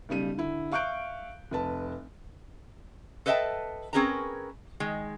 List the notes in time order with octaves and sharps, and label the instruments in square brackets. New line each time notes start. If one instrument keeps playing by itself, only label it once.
[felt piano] B1 C#3 G3 D#7
D3 E4
E5 F5 C#6 F#6 G6 D7
F1 B4 A5
[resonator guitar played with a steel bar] A4 B4 D#5 E5 G5 A5
C4 C#4 G#4 A#4 B4 A#5
D#3 G#3